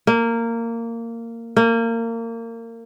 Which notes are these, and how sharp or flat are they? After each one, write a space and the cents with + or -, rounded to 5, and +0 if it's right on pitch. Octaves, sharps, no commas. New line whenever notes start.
A#3 -15
A#3 -25